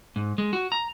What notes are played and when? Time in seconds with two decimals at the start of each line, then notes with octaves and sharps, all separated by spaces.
0.16 G#2
0.38 G#3
0.53 F#4
0.72 A#5